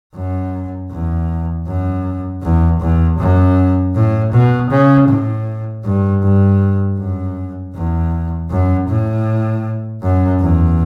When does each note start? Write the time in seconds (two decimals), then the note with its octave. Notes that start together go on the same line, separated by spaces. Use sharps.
0.15 F#2
0.90 E2
1.67 F#2
2.42 E2
2.80 E2
3.18 F#2
3.95 A2
4.33 B2
4.70 C#3
5.08 A2
5.84 G2
6.23 G2
6.98 F#2
7.74 E2
8.50 F#2
8.88 A2
10.02 F#2
10.41 E2